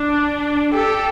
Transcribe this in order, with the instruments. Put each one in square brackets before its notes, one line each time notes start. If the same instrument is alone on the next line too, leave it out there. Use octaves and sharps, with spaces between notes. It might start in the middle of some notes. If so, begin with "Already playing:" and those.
Already playing: [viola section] D4
[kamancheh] G4 [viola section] A4